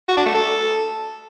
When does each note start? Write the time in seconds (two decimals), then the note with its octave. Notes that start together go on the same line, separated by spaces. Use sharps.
0.09 F#4
0.17 D4
0.26 A3
0.34 A4